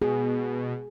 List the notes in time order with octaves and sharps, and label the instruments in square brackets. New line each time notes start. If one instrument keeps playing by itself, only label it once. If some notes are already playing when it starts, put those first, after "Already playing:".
[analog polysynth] B2 [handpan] G#4